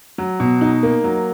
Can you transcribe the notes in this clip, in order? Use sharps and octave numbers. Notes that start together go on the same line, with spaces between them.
F#3
B2
D#4
A#3
F#3